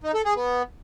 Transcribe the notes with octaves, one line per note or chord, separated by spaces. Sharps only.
D#4
A4
G#4
B3